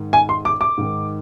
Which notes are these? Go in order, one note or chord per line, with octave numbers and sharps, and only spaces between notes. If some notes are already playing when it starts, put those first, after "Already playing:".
Already playing: G#2 D#3
G#5
C6
D6
D6
G#2 D#3